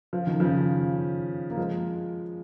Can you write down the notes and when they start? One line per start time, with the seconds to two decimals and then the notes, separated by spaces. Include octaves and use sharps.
0.13 F3
0.27 D#3
0.40 C#3 F3
1.50 A#3
1.57 F3 G#3